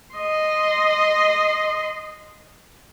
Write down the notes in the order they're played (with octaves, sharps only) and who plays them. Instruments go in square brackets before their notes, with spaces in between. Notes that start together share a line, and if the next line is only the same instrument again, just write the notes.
[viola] D#5 C6